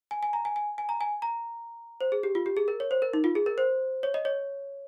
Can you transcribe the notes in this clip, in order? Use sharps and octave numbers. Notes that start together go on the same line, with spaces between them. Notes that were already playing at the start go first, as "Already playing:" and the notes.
G#5
G#5
A#5
G#5
G#5
G#5
A#5
G#5
A#5
C5
G#4
G4
F4
G4
G#4
A#4
C#5
C5
A#4
D#4
F4
G#4
A#4
C5
C#5
D#5
C#5